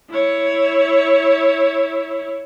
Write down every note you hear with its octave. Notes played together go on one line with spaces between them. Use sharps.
E4 C#5